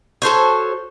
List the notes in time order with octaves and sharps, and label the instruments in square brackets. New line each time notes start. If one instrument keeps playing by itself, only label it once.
[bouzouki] F#4 A4 C5 C#5